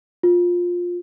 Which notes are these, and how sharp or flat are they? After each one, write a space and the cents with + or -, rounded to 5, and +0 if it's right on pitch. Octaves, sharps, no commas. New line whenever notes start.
F4 +15